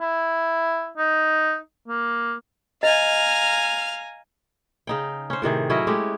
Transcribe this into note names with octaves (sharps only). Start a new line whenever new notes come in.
E4
D#4
A#3
D#5 F5 G#5 A#5 F6
C#3 D#4 G5
C#4 C5
A2 C3 D#3 G#4
F#3 C#4 E4 D#5
G#3 A3 G4